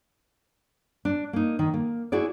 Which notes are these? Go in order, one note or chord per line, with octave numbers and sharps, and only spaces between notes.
D4
A#3 D#4
D#3
A#3
E4 F#4 G#4 D5